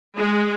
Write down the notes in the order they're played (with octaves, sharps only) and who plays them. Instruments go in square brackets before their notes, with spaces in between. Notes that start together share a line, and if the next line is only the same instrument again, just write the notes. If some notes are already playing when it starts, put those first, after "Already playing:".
[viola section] G#3